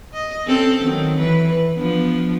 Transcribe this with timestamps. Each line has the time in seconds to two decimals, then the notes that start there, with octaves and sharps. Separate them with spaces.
0.14 D#5
0.47 C4 C#4 A4
0.81 D#3 F#3 C4
1.19 E3 B4
1.76 F3 B3 D4